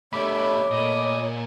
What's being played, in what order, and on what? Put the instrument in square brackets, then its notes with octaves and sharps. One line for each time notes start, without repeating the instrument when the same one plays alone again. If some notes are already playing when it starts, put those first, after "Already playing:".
[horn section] G2 E5 [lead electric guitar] G3 A3 [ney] C#5 [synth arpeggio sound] B5 D6
[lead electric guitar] A#2 [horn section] A3 D#5